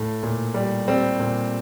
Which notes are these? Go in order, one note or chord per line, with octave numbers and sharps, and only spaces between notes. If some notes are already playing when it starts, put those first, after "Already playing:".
Already playing: A2
A#2
G3
G3 C4
A#2